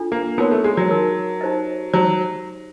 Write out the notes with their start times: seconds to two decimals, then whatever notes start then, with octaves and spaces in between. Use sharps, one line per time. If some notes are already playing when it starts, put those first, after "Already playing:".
Already playing: D4 F4 A4
0.12 A#3
0.38 B3 D#4 F#4 A#4 C#5
0.51 A3
0.64 G#3
0.77 F#3
0.89 D#4 F#4 A#4 C#5
1.41 D#4 G4 C5 D#5
1.93 F#3 D#4 G4 C5 D#5